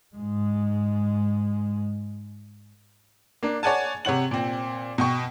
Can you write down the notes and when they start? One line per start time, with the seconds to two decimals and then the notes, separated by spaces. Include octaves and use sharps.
0.16 G#2 G#3
3.43 A#3 D4
3.63 C#5 D5 F#5 G#5 A5
4.05 C3 C#5 F#5 F#7
4.31 A#2 C4
4.98 B2 G5 C#6